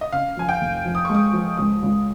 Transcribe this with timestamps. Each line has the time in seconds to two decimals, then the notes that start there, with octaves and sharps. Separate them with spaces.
0.01 D#5
0.13 C#3 F5
0.37 F3 G#5
0.49 G5
0.61 F1
0.85 F3
0.95 D#6
1.05 G#3 C#6
1.15 D#6
1.33 F3
1.57 C#2 D#6
1.82 C#2